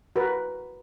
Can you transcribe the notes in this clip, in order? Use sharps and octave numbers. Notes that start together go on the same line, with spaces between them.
F#4 A#4 B4